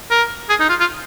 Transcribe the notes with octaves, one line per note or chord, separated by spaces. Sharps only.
A#4
G#4
D#4
F4
F4